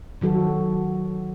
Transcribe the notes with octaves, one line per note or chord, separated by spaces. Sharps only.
D#3 F#3 F#4 A4